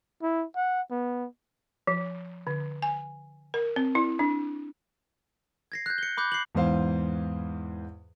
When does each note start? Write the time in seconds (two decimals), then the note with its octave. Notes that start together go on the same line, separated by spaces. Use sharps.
0.22 E4
0.56 F#5
0.91 B3
1.87 F3
2.47 D3
2.82 G#5
3.54 A#4
3.76 C4
3.95 E4
4.19 D4
5.72 G#6 A#6 C7
5.86 F#6 G6
5.98 C#7 G7
6.17 B5 D6 F#6 G6
6.32 C7 F#7
6.55 E2 G#2 E3 C5 F5